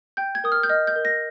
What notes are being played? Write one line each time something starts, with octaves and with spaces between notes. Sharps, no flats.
G5 G6
G#6
A#4 D#6
F6
G6
D#5 F6
G6
A#4
A#6